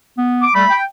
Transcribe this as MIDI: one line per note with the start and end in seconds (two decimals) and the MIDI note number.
0.18 0.46 59
0.42 0.54 86
0.55 0.65 55
0.55 0.65 57
0.55 0.76 83
0.70 0.83 79